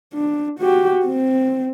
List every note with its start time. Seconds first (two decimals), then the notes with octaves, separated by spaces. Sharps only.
0.13 D4
0.59 F#4 G4
1.06 C4